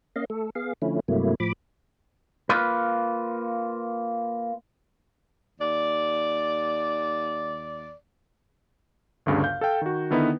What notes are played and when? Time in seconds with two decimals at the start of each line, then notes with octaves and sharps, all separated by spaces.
0.16 A#3 C#4 D#5 F5
0.30 A3 A4
0.55 B3 G#4 F5
0.82 D3 F3 A3 C#4 E4
1.08 G2 C3 F#3 A3 A#3 E4
1.40 A2 F3 B5 D6
2.49 A#3 F4 B4
5.59 D#2 D5
9.26 G1 D2 G2 C#3
9.43 F5 G6
9.61 A4 F5 G5
9.81 D#3 F#4
10.11 D3 D#3 B3 D#4 E4 B4